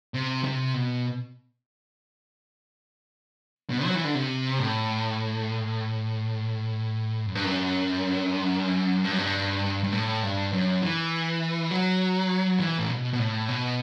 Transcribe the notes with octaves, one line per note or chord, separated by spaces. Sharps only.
C3
C3
B2
B2
F#3
E3
D3
C3
A2
F#2
G2
F#2
G2
F#2
G2
G2
A2
G2
F#2
E3
F#3
E3
A2
B2
B2
A2
B2